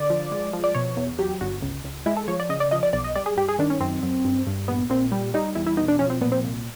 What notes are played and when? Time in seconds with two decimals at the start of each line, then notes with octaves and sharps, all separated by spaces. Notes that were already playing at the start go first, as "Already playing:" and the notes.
Already playing: D3 D5
0.10 F3
0.32 G#3
0.53 F3
0.64 D5
0.75 B2 C#5
0.97 E2
1.19 F#3 G4
1.41 G1 F#4
1.62 C#2
1.84 C#2
2.06 G#3 E4
2.17 A4
2.28 F3 C#5
2.40 D5
2.49 C#3 D#5
2.60 D5
2.71 F3 D#5
2.83 D5
2.93 B1 D5
3.04 D#5
3.15 G3 D5
3.26 G#4
3.37 G2 G4
3.48 G#4
3.59 D#3 D4
3.70 C#4
3.80 F#2 C4
4.03 F#2
4.25 G2
4.47 G2
4.68 A#1 B3
4.90 A#2 C4
5.12 G3
5.34 G3 D#4
5.55 E2 E4
5.66 E4
5.77 B2 D#4
5.88 D4
5.99 F3 C#4
6.10 C4
6.21 A#2 B3
6.32 C4
6.44 C2